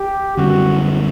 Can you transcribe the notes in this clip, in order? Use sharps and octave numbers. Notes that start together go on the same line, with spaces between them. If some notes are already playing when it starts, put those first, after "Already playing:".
Already playing: G4
F#2 D3 G3 C#4 F#4